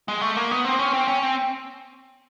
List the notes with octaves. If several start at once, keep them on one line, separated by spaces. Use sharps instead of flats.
G#3
A3
A#3
B3
C4
C#4
C4
C#4
C4